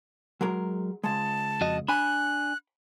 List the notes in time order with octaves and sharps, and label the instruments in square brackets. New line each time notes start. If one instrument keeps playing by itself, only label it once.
[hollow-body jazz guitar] F#3 G#3 A#4
[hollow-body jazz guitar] C#2 G#3 [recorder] A5
[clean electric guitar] F2 F#4 D#5
[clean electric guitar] D4 G#5 [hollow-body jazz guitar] B5 [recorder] F#6